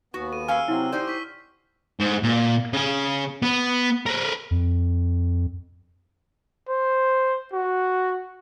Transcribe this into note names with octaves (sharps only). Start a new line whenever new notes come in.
D#2 B3 F#4
A4 D#7
C#4 F5 G#5 A#5 E6 F6
C3 F#3 C4 E4 F#5
D#4 G4 C5 D5 C6 D6
C#6 B6
G#2
A#2
C#3 G#5
B3
A#4 B4
F2
C5
F#4